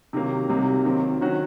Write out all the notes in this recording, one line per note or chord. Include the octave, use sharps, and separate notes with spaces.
C3 D#3 F#3 A#3
C2 C3 F#3 A#3 D#4
D#3 F#3 C4
D#3 F#3 C#4 F#4